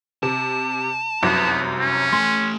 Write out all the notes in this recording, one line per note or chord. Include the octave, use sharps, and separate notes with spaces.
C3 A5
F1 C2 F#2 B3
C#4
A3 G#5 C6